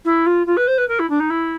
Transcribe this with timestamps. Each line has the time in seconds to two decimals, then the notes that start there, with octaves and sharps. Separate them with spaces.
0.05 E4
0.26 F4
0.46 F4
0.57 B4
0.67 C5
0.78 B4
0.88 A#4
0.99 E4
1.09 D4
1.20 D#4
1.30 E4